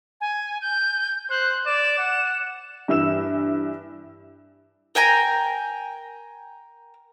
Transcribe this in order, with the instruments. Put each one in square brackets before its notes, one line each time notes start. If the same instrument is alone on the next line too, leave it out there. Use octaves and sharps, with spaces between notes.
[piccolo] G#5
G6
[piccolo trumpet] C5 [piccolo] F#6
[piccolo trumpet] D5 [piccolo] E7
[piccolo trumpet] F#5
[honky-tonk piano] G2 E3 E5 E6 E7
[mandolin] A#4 G5 G#5 A#5